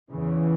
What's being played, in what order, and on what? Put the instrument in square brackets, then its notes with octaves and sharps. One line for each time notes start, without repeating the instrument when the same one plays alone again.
[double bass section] E2 C#3 E3